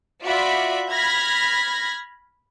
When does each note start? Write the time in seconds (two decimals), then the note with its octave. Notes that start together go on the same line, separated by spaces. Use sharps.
0.23 F4 F#4 D5 E5 B5
0.90 B5 F6 G#6 A#6 B6